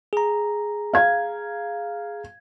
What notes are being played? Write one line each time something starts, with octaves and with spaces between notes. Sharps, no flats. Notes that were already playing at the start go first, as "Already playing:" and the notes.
G#4 A#5
F5 G#6